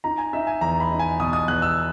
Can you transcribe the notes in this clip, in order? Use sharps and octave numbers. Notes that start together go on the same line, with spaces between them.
D#4 A#5
G#5
D#4 E5
G#5
E2 A#5
B5
D#4
G#5
B2 D#6
D#6
E2 F#6
E6